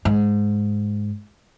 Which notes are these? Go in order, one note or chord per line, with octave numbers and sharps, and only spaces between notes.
G#2